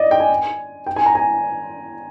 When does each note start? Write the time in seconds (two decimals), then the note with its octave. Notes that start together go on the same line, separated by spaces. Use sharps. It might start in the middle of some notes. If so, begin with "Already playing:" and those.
Already playing: D5 D#5
0.11 G5
0.20 G#5
0.86 G5
0.96 G#5
1.06 A#5
1.15 G#5